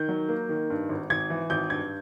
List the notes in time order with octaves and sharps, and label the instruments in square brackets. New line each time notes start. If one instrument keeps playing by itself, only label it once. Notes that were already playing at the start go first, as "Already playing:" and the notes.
Already playing: [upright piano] D#3 G6
F#3
A#3
D#3
G2
G#1
G#1 G#6
E3
G#1 G6
G2 G#6